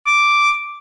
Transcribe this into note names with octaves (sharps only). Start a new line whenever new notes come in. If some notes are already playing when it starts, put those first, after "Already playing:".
D6